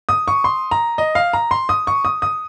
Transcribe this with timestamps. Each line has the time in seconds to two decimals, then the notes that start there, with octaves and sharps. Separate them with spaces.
0.09 D#6
0.28 C#6
0.44 C6
0.71 A#5
0.98 D#5
1.15 F5
1.33 A#5
1.51 C6
1.69 D#6
1.87 C#6
2.05 D#6
2.22 D#6